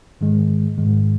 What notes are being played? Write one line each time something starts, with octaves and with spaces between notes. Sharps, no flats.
G#2 D#3 G#3
G#2 D#3 G#3